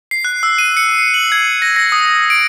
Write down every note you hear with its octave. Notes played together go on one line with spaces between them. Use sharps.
C7
F#6
E6
D#7
C#7
C7
F#7
G#6
A#6
A#6
D#6
D7